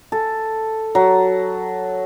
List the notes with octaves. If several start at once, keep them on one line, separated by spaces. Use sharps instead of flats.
A4
F#3